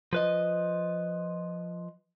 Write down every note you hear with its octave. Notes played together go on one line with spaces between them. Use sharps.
F3 B4 D#5